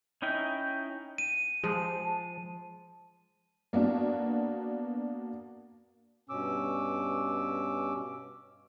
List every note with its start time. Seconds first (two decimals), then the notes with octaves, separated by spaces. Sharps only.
0.22 C#4 D#4 E4 G5
1.18 D#7
1.64 F3 G#3 A5
3.73 A#3 B3 D4 F#4
6.29 G2 B2 C#4 D6 E6